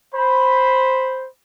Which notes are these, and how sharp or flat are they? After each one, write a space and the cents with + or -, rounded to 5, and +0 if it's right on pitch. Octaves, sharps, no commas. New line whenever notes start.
C5 +0 B5 +0